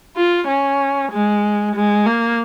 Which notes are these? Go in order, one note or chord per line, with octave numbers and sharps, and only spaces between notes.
F4
C#4
G#3
G#3
A#3